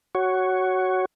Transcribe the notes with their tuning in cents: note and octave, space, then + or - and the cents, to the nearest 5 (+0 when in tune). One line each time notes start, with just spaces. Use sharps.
F#4 +10 C#5 +0